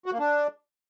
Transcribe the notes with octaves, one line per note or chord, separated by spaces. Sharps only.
F#4
A#3
D4